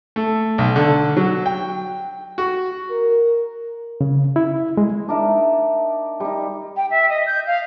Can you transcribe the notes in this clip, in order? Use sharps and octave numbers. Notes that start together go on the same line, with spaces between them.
A3
B1
D3
F#3
G5
F#4
A#4
C#3
E4
G#3
D4 D#4 A#4 E5
G3 D#4
G5
E5
D#5
G6
F5